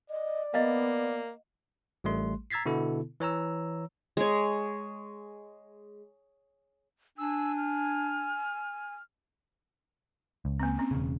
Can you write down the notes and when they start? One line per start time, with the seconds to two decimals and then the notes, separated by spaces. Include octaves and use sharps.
0.10 D5 D#5
0.54 A#3 B3 D#5 F5
2.04 A1 G3 A3 C6
2.51 A#5 E6 G#6 A6 B6 C7
2.66 B2 D3 B3 E4 A4
3.20 E3 C#5 A#5 E6
4.17 G#3 C#5
7.18 D4 G#5 E6
7.57 F6
10.45 C#2
10.60 A#3 C4
10.78 C4 C#4
10.91 E1 C#3